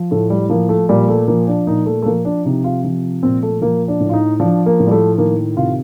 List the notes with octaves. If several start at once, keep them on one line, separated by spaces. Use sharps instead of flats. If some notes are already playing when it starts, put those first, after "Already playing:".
Already playing: F3
A2 A3
G3
F3 A#3
A3
A#2 G3
A3
F3 A#3
D4
A#2 D#4
A3
A3
F3 A#3
D4
C3 D#4
F4
F3
A#2 C4
A3
F3 A#3
D4
A2
F4
D#4
F3 D4
A#3
A2
G3
A3
D#3 A#3
C3 F4